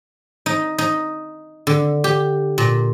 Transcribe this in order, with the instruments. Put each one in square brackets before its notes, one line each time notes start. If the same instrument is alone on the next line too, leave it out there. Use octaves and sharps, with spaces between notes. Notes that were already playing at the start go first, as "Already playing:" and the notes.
[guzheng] D#4
D#4
D3
G4
A#2